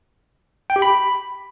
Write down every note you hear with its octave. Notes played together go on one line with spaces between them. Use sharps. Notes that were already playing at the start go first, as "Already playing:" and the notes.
G5
G4
B5